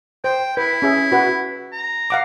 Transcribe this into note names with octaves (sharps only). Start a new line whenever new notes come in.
C5 G5
E4 B4
C#4 G#4 E5
F#4 B4 F#5
A#5
F5 F#5 D6